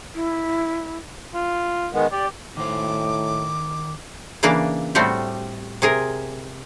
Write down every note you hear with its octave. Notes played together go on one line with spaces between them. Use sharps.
E4
F4
D#3 G#3 B3
G4 D5
A2 D#3 C5 D6
C#3 E3 A#3 D4 D5
A2 G3 A3 C4 F#4 G4
C3 G#4 A#4